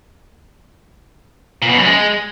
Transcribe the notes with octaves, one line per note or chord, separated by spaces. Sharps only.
A#2
B2
F#2
G#3